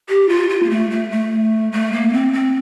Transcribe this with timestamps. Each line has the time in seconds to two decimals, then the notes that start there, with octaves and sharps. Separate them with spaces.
0.09 G4
0.29 F4
0.50 F4
0.63 A#3
0.70 A3
0.91 A3
1.11 A3
1.72 A3
1.92 A#3
2.13 C4
2.33 C4